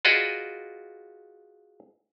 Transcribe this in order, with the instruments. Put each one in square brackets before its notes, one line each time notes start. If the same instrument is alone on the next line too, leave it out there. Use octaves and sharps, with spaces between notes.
[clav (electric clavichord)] F4 F#4 G#4 B4 D5 D#5